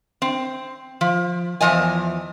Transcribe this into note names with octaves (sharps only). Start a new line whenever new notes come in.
C4
F3
E2 E3 F3 D#5 G#5